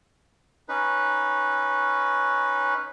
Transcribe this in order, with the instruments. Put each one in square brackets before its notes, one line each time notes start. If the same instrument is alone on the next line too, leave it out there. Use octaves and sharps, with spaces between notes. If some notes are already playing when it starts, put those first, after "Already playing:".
[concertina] C#4 D#4 B4